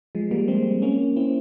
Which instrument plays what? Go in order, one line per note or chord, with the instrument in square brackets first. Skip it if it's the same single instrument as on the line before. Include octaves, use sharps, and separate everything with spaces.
[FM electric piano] F3 G#3
G3 A#3
G#3 C4
A#3 C#4
C4 E4